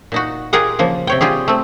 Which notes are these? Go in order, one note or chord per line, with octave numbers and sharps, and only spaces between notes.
A#2 D#4 F#4
F4 G4 G#4 A#4 D#5 F#5
C#3 F3 A#3
C3 C#5 G5
G3 F4 G4 G#4
A3 C4